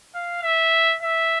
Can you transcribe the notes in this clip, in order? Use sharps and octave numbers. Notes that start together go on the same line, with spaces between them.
F5
E5
E5